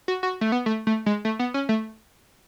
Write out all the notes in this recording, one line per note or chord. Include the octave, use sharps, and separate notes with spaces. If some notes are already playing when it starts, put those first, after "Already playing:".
F#4
F#4
A3
B3
A3
A3
G#3
A3
B3
C#4
A3